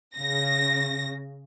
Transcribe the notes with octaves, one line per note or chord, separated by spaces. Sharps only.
C#3 A#6